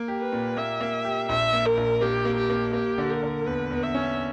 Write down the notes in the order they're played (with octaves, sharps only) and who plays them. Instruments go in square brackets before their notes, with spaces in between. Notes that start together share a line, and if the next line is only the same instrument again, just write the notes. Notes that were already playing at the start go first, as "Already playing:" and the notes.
Already playing: [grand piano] A#3
G4
[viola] B4
[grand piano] A#2
[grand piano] A#3 [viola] E5
[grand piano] A#3
G4
[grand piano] A#1 [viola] E5
[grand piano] A#3
[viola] A#4
[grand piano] A#1
[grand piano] A#3 [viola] G4
[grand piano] A#3
[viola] G4
[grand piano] A#3
[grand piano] A#3 [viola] G4
[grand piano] D3
[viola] A#4
[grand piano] D3
[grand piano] E2 [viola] B4
[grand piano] E2
[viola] E5
[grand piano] C#4